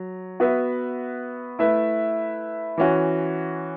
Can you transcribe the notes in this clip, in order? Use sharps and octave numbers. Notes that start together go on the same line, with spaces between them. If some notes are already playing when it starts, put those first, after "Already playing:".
Already playing: F#3
B3 F#4 B4 E5
A3 E4 B4 E5
E3 C#4 F#4